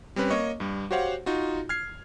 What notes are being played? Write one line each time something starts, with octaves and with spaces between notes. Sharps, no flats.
G3 C4 C#4 B4
A#3 C#5 D#5 C#6
G2 G3
F#4 G4 C5 C#5 F5 F#5
D#4 F4 F#4
F6 G#6 C7